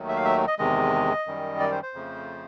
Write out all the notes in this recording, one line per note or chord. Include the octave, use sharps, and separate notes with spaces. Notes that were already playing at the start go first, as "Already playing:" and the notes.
Already playing: D#2 D#3 F#3 A3
E5
F5
E5
D#5
E2 C3 D#3 G#3 D#5
F#2 D#3 G3
D5
C5
C5
F2 C#3 F3 A3